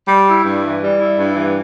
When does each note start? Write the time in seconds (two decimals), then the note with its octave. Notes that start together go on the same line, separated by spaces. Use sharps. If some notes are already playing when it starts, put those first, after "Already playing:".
0.08 G3
0.26 E4
0.44 G2
0.63 E3
0.81 G3
0.99 E4
1.17 G2
1.35 E3